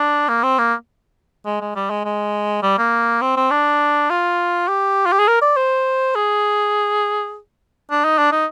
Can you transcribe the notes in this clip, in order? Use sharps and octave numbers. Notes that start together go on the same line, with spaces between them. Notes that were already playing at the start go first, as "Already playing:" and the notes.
Already playing: D4
A#3
C4
A#3
G#3
G#3
G3
G#3
G#3
G3
A#3
C4
C4
D4
F4
G4
F4
G4
G#4
A#4
D5
C5
G#4
D4
D#4
D4
D#4